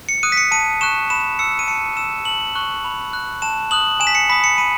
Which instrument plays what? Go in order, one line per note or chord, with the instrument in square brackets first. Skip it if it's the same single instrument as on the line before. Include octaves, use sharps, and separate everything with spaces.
[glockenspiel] C#7
D#6 F#6 D#7
B6
C#7
A5 D#7
C#6 F#6 E7
B5 E7
E6 C#7
D#7
A5 C#7
E6 E7
A5 F#7
C#6 F#6
B5
F#6
A5 E7
D#6 F#6 F#7
G#5 E7
B6
C#7
B5 D#6 B6
C#7
B5 D#7